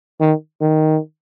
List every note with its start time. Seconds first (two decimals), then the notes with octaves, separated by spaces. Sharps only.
0.20 D#3
0.61 D#3